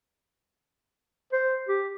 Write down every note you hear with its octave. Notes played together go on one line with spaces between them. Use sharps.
C5
G4